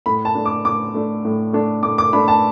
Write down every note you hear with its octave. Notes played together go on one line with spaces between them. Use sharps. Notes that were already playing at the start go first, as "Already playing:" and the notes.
A2 B5
A5
A3 D4
D6
A2 D6
A3 D4
A2
A3 D4
A2 D6
D6
A3 D4 B5
A5